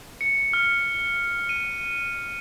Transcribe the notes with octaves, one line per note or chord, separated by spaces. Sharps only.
C#7
F6
D#7